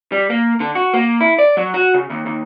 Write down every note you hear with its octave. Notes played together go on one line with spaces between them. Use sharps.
G3
A#3
D3
F#4
A#3
E4
D5
F#3
F#4
C#3
D#2
D#2